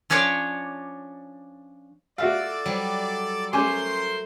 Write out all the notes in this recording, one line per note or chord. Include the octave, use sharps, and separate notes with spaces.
F3 C#4 D4 C#5 D5
F4 F#4 A4 D5 E5 F5
F#3 G3
A3 C#4 A#4 C5 G#5 C6 D6